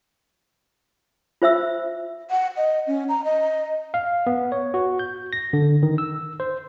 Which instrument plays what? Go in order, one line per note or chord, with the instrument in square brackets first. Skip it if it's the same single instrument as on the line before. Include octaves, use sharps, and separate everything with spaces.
[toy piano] F4 C5 E5 E6
[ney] F#5
D#5
C#4
A#5
D#5
[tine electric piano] F5
B3
C#5
F#4
G6
A#6
D3
D#3
E6
C5